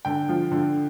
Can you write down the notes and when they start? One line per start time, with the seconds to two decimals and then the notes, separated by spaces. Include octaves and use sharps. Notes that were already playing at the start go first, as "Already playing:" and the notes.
0.05 D3 G5
0.29 F3
0.52 D3